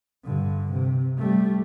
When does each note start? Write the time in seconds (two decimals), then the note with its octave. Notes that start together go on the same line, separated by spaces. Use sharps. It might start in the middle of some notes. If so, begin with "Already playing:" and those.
0.25 G2 D3
0.72 C3
1.18 G3 A3